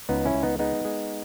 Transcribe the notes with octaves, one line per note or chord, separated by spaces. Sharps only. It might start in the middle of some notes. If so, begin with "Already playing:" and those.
C#2 B3 D#4
C#4 E4
C#2
B3 D#4
G#3 B3 D#4
G#3